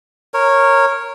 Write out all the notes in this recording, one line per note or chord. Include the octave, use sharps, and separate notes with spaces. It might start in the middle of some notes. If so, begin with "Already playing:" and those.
A#4 C#5